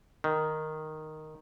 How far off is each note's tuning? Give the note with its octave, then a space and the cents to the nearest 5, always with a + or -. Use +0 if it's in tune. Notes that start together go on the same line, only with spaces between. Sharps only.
D#3 -5